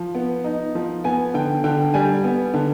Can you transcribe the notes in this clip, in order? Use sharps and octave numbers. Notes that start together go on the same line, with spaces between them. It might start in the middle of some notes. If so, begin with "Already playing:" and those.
Already playing: F3
B3
D#4
F3
B3 G#5
D3 G5
D3 G5
G3 G#5
B3
D3